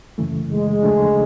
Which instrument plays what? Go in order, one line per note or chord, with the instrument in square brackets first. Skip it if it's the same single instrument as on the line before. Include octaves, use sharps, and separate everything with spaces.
[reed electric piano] F#2 C#3 E3 A3
[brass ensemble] G#3
[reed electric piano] D#2 C#3 F3 A3 D4